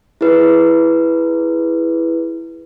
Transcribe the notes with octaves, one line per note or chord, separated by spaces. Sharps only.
E4 G#4 B4